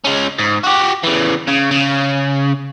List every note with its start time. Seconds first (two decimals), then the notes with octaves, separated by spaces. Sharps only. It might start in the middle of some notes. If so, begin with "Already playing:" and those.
0.04 G#3 C#4
0.39 G#2
0.64 F#4 G4
1.04 C#3 E3
1.47 C#3
1.71 C#3